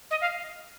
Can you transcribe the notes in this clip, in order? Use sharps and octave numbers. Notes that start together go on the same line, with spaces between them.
D#5
F5